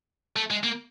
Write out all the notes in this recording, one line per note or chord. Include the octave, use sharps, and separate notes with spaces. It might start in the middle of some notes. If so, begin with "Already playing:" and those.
A3
G#3
A#3